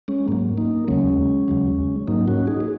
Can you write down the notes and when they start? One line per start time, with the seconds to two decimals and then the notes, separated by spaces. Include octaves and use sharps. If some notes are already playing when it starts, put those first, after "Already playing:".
0.08 G#3 C#4
0.28 G#2 F#3 A#3
0.58 A#3 D#4
0.88 D#2 C#3 F#3 G#3 C#4
1.48 D#2 C#3 F#3
2.08 G#2 F#3 A#3 D#4
2.28 C#4 F#4
2.47 D#4 G#4
2.60 G#4